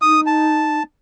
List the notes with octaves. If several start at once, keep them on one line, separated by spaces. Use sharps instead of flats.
D#4 D#6
A5